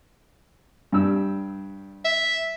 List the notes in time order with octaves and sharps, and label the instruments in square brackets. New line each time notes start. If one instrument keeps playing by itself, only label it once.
[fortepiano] G2 G3 E6
[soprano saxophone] E5